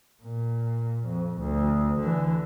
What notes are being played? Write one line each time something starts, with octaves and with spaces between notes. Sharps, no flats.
A#2
F2
D2
D3 E3